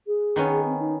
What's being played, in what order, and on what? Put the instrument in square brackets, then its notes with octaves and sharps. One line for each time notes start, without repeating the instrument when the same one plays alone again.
[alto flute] G#4
[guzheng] D#3 B3 C#4
[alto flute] C4
D#4